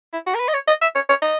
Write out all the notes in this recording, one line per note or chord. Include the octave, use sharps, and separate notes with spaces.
E4
F#4
A#4
B4
D#5
C#5
D#5
E5
C#5
C#5
D#5